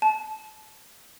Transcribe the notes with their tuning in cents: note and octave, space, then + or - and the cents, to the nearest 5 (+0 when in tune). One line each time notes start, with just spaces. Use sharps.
A5 -25